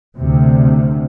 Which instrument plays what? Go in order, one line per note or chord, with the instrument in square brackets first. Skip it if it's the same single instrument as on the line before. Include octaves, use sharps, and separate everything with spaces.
[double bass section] D2 C3